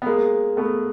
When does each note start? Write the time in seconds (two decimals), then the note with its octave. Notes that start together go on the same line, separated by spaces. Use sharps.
0.02 B3
0.06 G#3 A#3
0.57 A3 B3